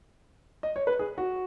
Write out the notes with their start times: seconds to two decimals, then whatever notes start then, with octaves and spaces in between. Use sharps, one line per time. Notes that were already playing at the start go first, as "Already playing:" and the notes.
0.63 D#5
0.76 C#5
0.87 B4
0.99 G#4
1.18 F#4